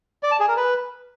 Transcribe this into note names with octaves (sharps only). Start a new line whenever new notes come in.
D5
A5
G#4
A#4
B4